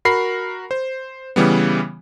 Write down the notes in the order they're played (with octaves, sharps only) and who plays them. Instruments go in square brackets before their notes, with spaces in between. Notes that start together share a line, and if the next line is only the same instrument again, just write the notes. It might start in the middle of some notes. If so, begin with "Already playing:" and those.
[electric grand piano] F#4 A#4 B5 C7
C5
C#3 E3 G3 B3